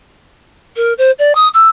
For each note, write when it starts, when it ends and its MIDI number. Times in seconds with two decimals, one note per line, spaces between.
0.76 0.93 70
0.98 1.11 72
1.19 1.35 74
1.35 1.48 87
1.54 1.69 88